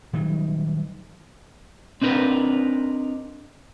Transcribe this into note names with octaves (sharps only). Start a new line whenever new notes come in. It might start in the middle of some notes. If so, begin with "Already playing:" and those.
D#3 F#3 G3
C4 D4 D#4 A#4 B4